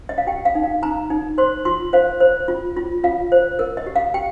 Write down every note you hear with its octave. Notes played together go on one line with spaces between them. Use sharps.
D#5
F5
G4 G5
F5
D#4
F5
D#4 A#5
D#4
C5 C6
F4 C6
C5 F5
C5
F4
F4
F4 F5
C5
A#4
D#5
G4
F5
G4 G5